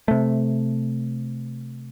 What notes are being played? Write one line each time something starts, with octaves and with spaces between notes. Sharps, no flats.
C3 A3